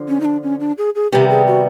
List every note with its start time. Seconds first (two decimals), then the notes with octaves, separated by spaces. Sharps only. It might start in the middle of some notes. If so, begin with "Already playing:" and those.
Already playing: D3 F3
0.08 C#4
0.20 D#4
0.25 D4
0.43 C#4
0.60 D4
0.78 G#4
0.95 G#4
1.12 C3 D#3 G3 B3 G4
1.30 G#4
1.47 F#4